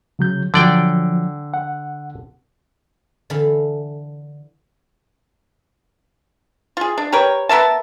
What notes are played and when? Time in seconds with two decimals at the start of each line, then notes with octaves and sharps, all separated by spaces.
0.19 C#3 F#3 G6
0.54 D3 F3 F#3 D5 G5
1.54 F#5
3.30 D3 E3 A4 F5 B5
6.77 F4 G#4
6.98 D4
7.12 G4 A#4 B4 C#5
7.49 B3 A#4 E5 A5